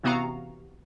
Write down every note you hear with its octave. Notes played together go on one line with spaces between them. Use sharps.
A1 C3 B3 F#4 F5 A#5